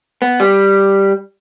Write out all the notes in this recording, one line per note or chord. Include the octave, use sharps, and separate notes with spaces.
B3
G3